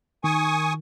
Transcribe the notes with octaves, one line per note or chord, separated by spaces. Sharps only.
D#3 G#5 C#6 D#6